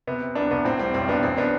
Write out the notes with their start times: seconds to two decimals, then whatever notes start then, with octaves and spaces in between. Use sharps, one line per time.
0.07 C3 B3
0.22 C3
0.35 C2 B3 D4
0.51 C2 B3
0.65 A2 C4
0.79 G3 C4
0.94 B1 C4
1.08 B1 B3 D4
1.23 A1 C4
1.37 B3 D4